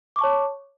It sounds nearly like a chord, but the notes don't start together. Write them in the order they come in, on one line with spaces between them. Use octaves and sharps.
D6 C#6 A5 C#5